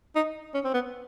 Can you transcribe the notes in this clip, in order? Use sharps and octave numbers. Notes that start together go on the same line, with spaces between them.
D#4
C#4
C4
B3